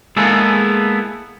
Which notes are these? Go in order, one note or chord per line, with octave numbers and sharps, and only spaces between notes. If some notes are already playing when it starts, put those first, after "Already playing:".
G#3 A#3 B3 E4 G#4 A4